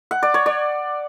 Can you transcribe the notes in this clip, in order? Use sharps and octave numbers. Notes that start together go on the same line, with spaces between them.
F#5
D5
C#5
D5